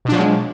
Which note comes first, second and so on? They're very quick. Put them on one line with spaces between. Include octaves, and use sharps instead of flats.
B2 D4 F3 F#3 G#3